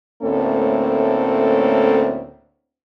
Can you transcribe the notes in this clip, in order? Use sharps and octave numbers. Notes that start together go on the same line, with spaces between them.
D2 A2 A#3 C4 C#4 A4